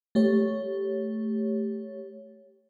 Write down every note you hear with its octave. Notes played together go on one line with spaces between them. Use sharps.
A3 G4 C#5